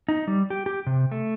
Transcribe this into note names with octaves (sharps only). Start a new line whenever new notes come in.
D#4
G3
G4
G4
C3
A3